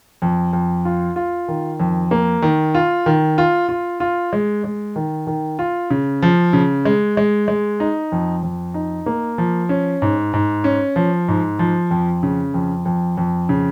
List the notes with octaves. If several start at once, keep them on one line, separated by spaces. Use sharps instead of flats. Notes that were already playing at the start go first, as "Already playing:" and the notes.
F2
F2
F4
F4
D#3
F2
A#3
D#3
F4
D#3
F4
F4
F4
G#3
G#3
D#3
D#3
F4
C#3
F3
C#3
G#3
G#3
G#3
D#4
F2
F2
D#4
A#3
F3
C#4
G#2
G#2
C#4
F3
G#2
F3
F2
C#3
F2
F2
F2
C#3